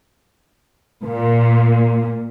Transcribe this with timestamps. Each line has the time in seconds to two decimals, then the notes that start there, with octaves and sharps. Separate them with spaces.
1.04 A#2